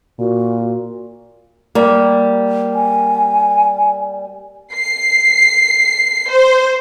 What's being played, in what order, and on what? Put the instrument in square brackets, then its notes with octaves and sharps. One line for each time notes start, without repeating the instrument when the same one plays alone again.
[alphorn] A#2 [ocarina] F#4
[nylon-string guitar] G3 A#3
[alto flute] G#5
[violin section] C7
C5